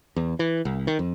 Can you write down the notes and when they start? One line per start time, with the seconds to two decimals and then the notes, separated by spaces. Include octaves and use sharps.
0.16 E2
0.39 E3
0.65 C2
0.87 D#3
0.99 F2